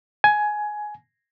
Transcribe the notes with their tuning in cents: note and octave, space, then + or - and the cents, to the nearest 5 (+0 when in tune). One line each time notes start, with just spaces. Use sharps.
G#5 +15